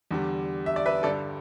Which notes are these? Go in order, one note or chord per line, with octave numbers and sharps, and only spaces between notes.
E2 D3 G3
E5
D5
B4 E5
G2 D3 G3 A4 D5